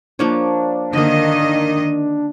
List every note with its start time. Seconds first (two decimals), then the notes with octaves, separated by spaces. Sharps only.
0.19 F3 A#3 D4 C#5
0.93 D3 D#3 A#3 D#5